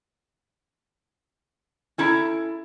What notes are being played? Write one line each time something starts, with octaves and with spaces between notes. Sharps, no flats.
C#4 E4 A4 A#5